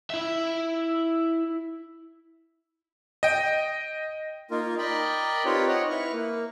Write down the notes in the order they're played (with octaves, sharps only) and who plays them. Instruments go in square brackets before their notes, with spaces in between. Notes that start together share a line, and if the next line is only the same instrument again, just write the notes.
[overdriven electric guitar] E4 E5
[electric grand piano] D#5 G5
[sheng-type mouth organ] A#3 D#4 F4 A#4
A#4 D5 D#5 G5 B5
C4 D#4 F4 G4 B4 C#5
C#5 D#5 F#5
E4 B4 C#6 F6
A#3